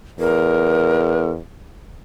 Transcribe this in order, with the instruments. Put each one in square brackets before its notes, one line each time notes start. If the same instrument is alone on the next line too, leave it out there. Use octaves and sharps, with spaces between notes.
[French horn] E2 [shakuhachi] A#4